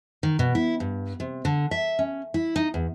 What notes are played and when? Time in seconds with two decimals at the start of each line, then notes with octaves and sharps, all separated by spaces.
0.23 D#3
0.39 B2
0.55 E4
0.80 G2
1.20 C3
1.45 D3
1.71 E5
1.99 C#4
2.34 E4
2.56 D#4
2.74 E2